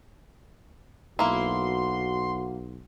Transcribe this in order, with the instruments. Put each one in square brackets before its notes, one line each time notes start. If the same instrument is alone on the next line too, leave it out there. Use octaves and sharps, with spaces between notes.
[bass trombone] B1 [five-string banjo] A#3 E4 [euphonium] F#4 [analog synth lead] C6